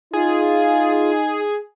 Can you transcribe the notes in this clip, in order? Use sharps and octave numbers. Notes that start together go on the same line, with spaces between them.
D#4 F4 G#4